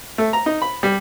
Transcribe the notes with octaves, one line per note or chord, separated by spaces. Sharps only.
A3
A#5
D#4
B5
G3